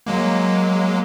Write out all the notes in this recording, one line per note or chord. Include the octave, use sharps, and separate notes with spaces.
F#3 G#3 A#3